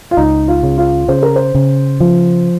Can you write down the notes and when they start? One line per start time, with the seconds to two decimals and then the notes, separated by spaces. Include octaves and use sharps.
0.11 F4
0.17 C#2 D#4
0.48 F4
0.63 C#3
0.78 F4
1.08 C#3 C5
1.23 A#4
1.36 C5
1.55 C#3
2.00 F3